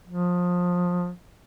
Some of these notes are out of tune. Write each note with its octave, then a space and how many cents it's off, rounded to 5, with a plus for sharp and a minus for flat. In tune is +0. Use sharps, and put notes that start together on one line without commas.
F3 +25